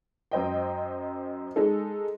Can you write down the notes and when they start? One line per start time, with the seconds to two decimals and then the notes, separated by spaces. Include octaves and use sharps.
0.32 F#2 C5 D#5 G5
1.56 G#3 D#4 A4